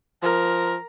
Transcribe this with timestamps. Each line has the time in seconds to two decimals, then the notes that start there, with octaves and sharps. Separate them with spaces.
0.23 F3 A#4